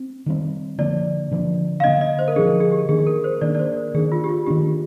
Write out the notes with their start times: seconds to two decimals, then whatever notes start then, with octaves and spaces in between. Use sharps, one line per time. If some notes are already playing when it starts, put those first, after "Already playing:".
Already playing: C4
0.26 D#3 G3 C4
0.78 D3 F3 A#3 D4 D5
1.31 D3 F3 A#3 D4
1.80 F5
1.84 D3 F3 A#3 D4 D#5
2.01 D#5
2.19 C5
2.28 A#4
2.36 D3 F3 A#3 D4 G#4
2.60 G#4
2.72 G4
2.89 D#3 A#3 D4 G#4
2.99 G#4
3.07 A#4
3.24 C5
3.41 D#3 A#3 D4 D5
3.55 D5
3.59 C5
3.77 A#4
3.94 D#3 A#3 D4 G#4
4.12 F4
4.24 G4
4.29 F4
4.47 D#3 A#3 D4 G4